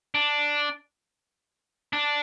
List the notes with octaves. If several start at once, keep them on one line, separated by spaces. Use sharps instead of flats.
D4
D4